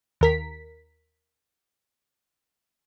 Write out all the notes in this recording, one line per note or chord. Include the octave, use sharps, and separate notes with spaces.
D#2 A#4 B6